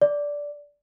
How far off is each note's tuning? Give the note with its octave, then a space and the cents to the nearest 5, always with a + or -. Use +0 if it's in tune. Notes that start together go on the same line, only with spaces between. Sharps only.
D5 -10